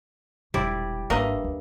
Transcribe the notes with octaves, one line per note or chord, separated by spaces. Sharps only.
E1 A#1 G3 E4 C5 D5
G#1 G2 A#3 D#5 E5
D#2